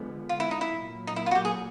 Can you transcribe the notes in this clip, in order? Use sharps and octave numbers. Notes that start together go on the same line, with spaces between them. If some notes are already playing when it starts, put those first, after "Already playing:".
Already playing: D3 F3 G#3 B3
F4
E4
D#4
E4
A#2 F#3 A#3
D#4
E4
F4
F#4
G4
G#4